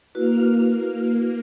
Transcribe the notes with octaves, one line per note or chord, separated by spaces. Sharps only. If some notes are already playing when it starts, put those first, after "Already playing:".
A#3 E4 F#4 B4 F6